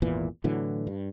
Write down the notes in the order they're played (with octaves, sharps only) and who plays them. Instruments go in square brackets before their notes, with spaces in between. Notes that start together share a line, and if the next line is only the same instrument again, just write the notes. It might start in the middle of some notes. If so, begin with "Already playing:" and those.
[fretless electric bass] G#1 E2 A#2 E3
A2 D3 E3 F#3
G2